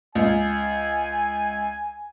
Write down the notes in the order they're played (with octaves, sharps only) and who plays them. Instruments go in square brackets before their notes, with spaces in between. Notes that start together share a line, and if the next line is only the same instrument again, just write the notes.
[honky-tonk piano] C#2 [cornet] G#5